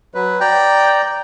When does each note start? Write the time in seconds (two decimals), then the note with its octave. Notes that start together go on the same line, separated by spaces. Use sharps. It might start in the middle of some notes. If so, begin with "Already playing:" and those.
0.14 F#3 B4
0.41 D5 G5 A#5